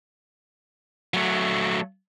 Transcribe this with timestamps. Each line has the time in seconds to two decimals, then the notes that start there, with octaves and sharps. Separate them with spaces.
1.14 F#3 A3